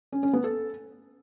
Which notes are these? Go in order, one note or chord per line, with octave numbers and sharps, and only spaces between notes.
C#4
C#4
B3
A4